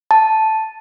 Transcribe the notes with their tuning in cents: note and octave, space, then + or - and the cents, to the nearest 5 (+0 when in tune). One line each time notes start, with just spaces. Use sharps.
A5 -5